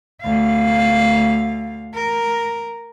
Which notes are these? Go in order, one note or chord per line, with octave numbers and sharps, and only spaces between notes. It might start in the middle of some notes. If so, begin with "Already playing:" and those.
D2 F5
A#4